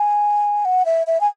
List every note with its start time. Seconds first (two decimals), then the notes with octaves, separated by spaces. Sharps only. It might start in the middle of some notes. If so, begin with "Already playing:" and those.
Already playing: G#5
0.65 F#5
0.85 E5
1.07 E5
1.21 G#5